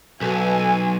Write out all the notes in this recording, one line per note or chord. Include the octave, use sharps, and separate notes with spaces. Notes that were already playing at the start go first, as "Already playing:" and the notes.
B1 B2 A4 G#5